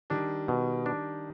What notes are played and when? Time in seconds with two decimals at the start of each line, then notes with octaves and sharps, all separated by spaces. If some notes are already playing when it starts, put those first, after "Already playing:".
0.10 D#3 G3 D4
0.48 B2
0.86 D4